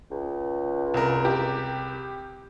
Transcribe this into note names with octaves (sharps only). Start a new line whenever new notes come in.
C#2
C2 A#4
G4